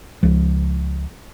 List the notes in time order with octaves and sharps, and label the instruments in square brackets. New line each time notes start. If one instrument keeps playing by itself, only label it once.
[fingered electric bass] C#2 F3